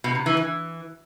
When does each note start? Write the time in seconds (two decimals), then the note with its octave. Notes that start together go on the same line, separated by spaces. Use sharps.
0.04 B2
0.15 C3
0.26 E3
0.37 E3